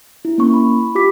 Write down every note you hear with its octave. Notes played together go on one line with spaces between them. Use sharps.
E4
A#3 C#4 C#6
B5
F4 G4 D6 B6